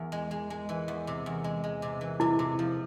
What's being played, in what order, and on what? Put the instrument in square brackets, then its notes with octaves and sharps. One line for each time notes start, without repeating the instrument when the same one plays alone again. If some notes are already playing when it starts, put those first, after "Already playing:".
Already playing: [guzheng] E2
G#3
G#3
G#3
E3
E2
C3
E2
G#3
G#3
C3
E3
[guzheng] C3 [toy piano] E4
[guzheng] C3
F3